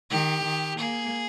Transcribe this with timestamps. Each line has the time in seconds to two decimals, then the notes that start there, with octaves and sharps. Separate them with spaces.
0.10 D#3 G4
0.44 D#3
0.79 A#3 G#4